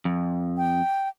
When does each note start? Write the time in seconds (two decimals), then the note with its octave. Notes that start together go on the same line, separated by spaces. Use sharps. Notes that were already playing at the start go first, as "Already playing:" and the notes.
0.05 F2
0.57 G5